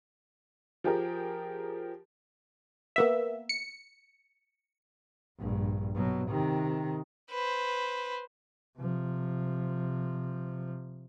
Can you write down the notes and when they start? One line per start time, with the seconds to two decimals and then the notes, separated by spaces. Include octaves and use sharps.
0.84 F3 G4 G#4 A#4
2.96 A#3 B3 E5
3.49 C#7
5.38 A#1 G2
5.94 B2 F#3
6.29 C3 D#3
7.31 B4 C5
8.78 C3 F3